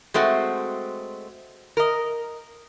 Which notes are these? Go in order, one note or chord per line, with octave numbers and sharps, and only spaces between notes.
G#3 A3 C4 F#4
A#4 D#5